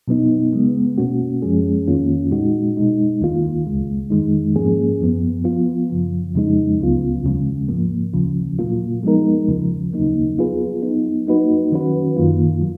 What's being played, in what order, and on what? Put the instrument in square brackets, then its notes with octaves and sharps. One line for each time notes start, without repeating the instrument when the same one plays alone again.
[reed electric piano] B2 F#3 B3 D#4
C#3 G#3 B3
B2 A#3 C#4 F#4
F#2 F3 G#3 C#4 G#4
F2 D#3 A#3 C#4 F4
A#2 G#3 D#4 F#4
B2 G#3 D#4
D#2 D#3 A#3 F4
C#2 C#3 G#3
F2 D#3 G#3 D#4
G#2 F3 A#3 C#4 G#4
F#2 F3 B3
F3 B3 F4
F#2 C#3 F3
F2 C#3 F3 G#3 D#4
C#2 C#3 F#3 B3 F4
D#2 C#3 F3 G#3
G#2 F3 A#3
D#2 C#3 F3
A#2 F#3 A#3 F4
F3 G#3 B3 D#4 A#4
D#2 C#3 F3
D#2 C#3 F#3 A#3 D#4
F#3 B3 F4 G#4 B4
F#3 B3 D#4
F#3 A#3 D#4 F#4 B4
D#3 F#3 C#4 F#4 B4
F#2 D#3 A#3 F4
F#3